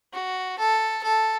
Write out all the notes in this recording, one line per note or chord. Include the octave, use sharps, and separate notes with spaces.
F#4
A4
A4